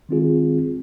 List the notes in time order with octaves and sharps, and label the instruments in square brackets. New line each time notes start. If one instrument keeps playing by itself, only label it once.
[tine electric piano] D#3 G#3 C4 F4 G#4